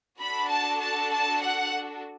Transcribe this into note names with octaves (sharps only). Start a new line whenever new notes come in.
D4 F#4 A4 B5
A5
A5
A5
F#5